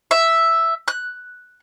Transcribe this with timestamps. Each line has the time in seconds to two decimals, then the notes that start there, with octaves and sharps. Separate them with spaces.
0.11 E5
0.88 F#6